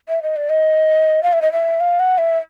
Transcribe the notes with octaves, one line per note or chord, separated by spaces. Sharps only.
E5
D#5
D5
D#5
F5
E5
D#5
E5
F5
F#5
E5